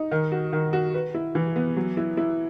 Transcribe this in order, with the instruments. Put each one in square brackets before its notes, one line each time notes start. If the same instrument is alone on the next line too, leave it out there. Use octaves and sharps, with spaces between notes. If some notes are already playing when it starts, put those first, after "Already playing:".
Already playing: [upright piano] D#4
D#3
F#4
D#3
F#4
B4
E4
E3
B3
F#3
E4
E4